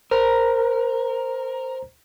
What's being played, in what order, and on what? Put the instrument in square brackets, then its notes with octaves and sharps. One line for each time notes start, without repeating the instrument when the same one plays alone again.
[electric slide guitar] A#4 [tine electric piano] C5 A#5